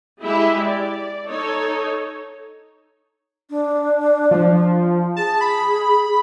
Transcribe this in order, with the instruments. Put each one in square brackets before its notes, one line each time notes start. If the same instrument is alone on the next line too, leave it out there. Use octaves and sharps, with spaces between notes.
[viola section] G#3 E4 G4 E5
D5
D#4 A4 C#5
[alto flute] D4
[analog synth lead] F3
[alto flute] G#4 [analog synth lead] A5
[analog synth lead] B5